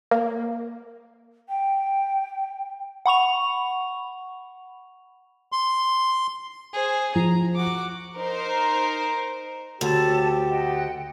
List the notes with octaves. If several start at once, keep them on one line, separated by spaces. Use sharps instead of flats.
A#3
G5
F#5 B5 C#6 F7
C6
G#4 C5
F3 A#5
F#4 D6
D#4 A#4 C5
D2 G4 A4 C#5 A5
D#5 F#5 G5